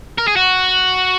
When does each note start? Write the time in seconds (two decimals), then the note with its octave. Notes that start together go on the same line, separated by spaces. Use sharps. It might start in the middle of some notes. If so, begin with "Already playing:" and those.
0.18 A#4
0.28 G#4
0.36 F#4